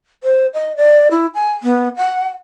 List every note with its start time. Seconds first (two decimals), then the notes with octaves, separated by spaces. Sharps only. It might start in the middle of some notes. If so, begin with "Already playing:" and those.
0.24 C5
0.54 D#5
0.77 D5
1.11 E4
1.35 G#5
1.63 B3
1.97 F#5